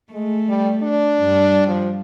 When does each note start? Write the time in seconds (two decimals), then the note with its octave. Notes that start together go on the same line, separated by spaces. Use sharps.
0.13 G#3 A3
0.48 G3
0.82 D4
1.20 G2 G3
1.67 F3